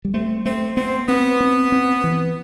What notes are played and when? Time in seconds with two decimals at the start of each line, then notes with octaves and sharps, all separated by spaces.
0.05 G3
0.14 A3 C4
0.46 A3 C4
0.77 B3 C4
1.08 B3 C4
1.41 C4
1.72 C4
2.04 E3